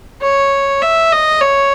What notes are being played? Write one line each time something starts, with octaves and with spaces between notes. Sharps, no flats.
C#5
E5
D#5
C#5